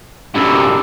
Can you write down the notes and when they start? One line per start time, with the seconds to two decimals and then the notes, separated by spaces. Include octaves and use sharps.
0.35 F#2 C3 D4 E4 A4